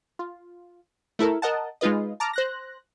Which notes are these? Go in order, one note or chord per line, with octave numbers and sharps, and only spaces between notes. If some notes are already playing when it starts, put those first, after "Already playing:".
F4
A3 E4 A4 A#4
A#4 D#5 F#5 A5
G#3 D#4 F4 B4 D#5
A5 A#5 D6 F6
C5 F#6 A#6